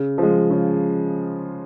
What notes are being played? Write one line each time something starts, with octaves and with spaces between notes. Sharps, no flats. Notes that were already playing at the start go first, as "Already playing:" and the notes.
Already playing: C#3
F3 G#3
C#3